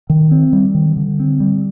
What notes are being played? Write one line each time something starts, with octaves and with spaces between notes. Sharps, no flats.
D#3
C4
G3
D#3
D3
C4
G3